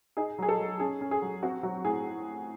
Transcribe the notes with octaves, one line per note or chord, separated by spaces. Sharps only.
D#4 G#4
F#3 G#4
A4
F#3
C#4 G#4
C#4
G#4
F#3
C4 F#4
F#3 F#4
A2 G#4